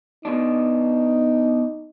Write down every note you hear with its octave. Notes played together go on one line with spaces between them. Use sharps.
B2 D4 D#4